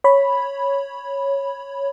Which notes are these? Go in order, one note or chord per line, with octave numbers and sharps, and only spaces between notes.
C#5 B5